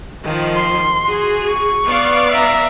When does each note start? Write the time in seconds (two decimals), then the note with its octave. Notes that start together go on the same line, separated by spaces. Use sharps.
0.24 D#3 F3
0.56 C6
1.06 F#4 G#4
1.49 C#6
1.85 B3 D5 F5
2.31 E5 A#5